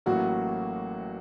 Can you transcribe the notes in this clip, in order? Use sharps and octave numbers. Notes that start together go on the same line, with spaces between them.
A1 A2 F#3 A#3 F#4